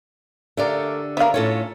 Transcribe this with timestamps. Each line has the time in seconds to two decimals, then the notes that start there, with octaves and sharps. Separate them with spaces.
0.57 D3 A3 G4 A#4 D5 F5
1.17 B3 D4 A#4 E5 F5
1.34 A2 C#4 F4 A4 C#5